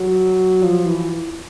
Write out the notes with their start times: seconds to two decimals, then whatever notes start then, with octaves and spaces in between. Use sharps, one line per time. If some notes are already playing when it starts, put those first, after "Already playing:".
Already playing: F#3
0.62 F3
0.86 E3